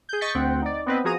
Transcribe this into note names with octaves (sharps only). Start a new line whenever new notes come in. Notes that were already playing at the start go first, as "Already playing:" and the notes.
G#4 G6
D#5 C#6 G6 A6 B6 C#7
D2 C4 F#5 G5
D#4 D5
B3 C4 B4 D#5
F3 F#4 G#4 A#5 D#6